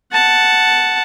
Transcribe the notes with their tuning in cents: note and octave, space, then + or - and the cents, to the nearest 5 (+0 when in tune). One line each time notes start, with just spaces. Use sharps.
F#5 +0 A5 +0